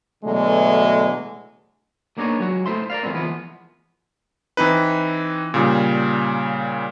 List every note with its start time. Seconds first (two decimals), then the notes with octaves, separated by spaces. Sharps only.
0.24 B2 D3 E3 F#3 G#3 A3
2.18 A#3 B3 D4 D#4 G#4 C#5
2.40 F#3 G#3 F#4
2.66 A3 E4 C5 E5 C6
2.90 A#4 B4 D5 F5
3.03 E3 F3 G#3 B3 C4
3.15 E3 F3 G#3 A#3 B3
4.57 E3 C4 D#4 B4
5.54 A#2 C#3 G3